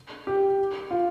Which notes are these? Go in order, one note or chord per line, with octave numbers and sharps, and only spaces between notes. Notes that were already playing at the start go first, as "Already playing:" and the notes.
G4
F4